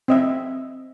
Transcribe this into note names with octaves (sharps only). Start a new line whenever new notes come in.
C4 D#5 E5